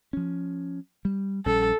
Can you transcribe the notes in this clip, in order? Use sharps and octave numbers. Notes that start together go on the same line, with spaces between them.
F3 C#4
G3
A#1 G3 C#4 A4